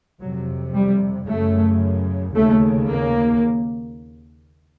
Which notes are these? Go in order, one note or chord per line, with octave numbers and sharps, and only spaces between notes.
F2 C3 F#3
G3
F#2 C#3 A3
D#2 C#3 A3
A#3